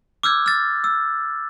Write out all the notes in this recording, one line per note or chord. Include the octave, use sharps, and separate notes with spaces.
D6 E6 F6 G6 G#6
F6 A6
E6